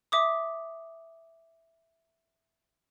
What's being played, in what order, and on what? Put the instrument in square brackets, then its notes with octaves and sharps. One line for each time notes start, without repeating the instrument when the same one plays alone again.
[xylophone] E5 D6 D#6